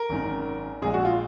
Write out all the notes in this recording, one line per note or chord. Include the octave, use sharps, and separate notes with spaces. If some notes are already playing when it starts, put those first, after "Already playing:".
Already playing: A#4
G#1 F#2 D#3
A#1 A#2 G#3 G#4
F#4
F4